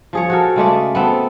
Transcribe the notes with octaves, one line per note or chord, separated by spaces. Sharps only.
F3 G#4 C#5
F#4 A4 A#4
C#3 G#3 A3 D5
B3 C4 A4